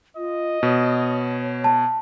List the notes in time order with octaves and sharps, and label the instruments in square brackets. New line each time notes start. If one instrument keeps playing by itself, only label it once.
[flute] F4 [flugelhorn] D#5
[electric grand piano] B2 [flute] C#5
[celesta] A5